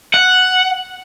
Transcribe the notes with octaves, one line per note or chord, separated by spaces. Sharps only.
F#5